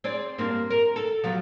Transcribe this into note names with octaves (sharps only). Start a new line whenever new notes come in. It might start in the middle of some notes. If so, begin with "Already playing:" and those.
C4 G#4 D5
G2 A#3 C4
A#4
A4
F3 F#3 B3